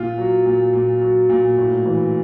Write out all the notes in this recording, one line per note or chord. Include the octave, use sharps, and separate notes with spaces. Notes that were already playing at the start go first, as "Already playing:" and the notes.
Already playing: A#2 F4
F#3
A#2
A#2
F#3
A#2
A2
E3